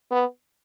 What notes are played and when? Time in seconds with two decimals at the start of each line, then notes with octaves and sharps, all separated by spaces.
0.12 B3